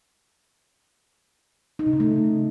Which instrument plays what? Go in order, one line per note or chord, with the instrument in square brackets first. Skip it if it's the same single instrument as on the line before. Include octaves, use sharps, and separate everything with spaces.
[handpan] D#4
C3
C#3
A3